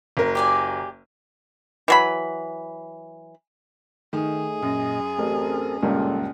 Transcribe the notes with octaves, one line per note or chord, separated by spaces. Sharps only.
F#1 A#4
G4 D5 G#5
E3 F#3 B5
D#3 A3 D#4 G#4
F#2 A#2 D#5
A1 C4 A4 A#4
C#2 G2 A#2 A4